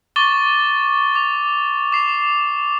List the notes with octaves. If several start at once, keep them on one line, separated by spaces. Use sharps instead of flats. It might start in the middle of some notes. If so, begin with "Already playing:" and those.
C#6 D6 A6 G7
D6 F7
D6 C7 F7